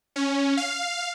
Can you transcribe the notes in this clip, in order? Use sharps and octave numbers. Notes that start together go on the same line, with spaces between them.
C#4
F5